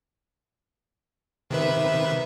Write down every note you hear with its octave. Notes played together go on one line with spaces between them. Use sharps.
C3 D#3 B4 E5